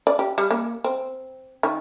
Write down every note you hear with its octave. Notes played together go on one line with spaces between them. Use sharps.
D5
G4
G3
A#3
C4
D#3